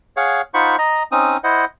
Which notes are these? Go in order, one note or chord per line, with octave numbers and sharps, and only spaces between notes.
G#4 C#5 F5 F#5
D#4 F4 C5 F#5 B5 C#6
D#5 A#5
C4 C#4 D#4 D#6
E4 C5 D#5 F#5